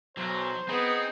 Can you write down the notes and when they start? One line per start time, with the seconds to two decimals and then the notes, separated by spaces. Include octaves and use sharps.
0.17 B1 F#3 C5
0.69 B3 C4 D#4 G#4